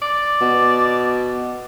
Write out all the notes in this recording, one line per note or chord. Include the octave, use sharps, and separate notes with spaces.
D5
B2